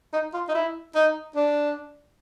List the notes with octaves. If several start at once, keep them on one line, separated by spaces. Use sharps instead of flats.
D#4
F4
D#4
E4
D#4
D4